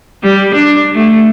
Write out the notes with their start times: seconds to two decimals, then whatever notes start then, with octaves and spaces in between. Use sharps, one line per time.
0.23 G3
0.55 D4
0.94 A3